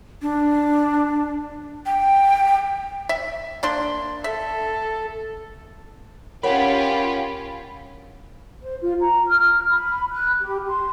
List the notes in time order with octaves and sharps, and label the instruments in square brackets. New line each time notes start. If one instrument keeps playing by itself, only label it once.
[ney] D4
G5
[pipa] E5
A#3 D4 C6
[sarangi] A4 [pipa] E5
[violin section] C#4 F4 G4 [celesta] A#4 C#5 F#5 [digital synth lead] B5
[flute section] C5
F4
A#5
F6
B5
F#6
G4
C6